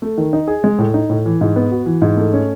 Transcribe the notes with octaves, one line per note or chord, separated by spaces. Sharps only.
A3
D#3
D#4
G#4
G#3
A2
D#4
A2
E3
G#2
B3
F#4
E3
G#2
A3
C#4